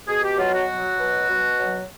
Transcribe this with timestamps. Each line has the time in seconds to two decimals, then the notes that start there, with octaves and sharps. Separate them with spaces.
0.07 B2 G#4
0.22 G4
0.37 F#3 F4
0.52 F#4
0.68 F#3
0.98 B2
1.29 B2
1.59 F#3